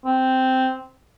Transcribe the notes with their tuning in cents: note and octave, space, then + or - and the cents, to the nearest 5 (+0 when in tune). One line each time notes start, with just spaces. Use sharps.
C4 -5